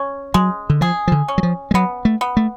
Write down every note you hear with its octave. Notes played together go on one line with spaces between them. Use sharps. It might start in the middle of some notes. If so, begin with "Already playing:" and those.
Already playing: C#4
F#3 G#3
D3
F3 G#4
F3
D3
C#4
F#3
F3
G#3
F#3 B3
A3
B3
A3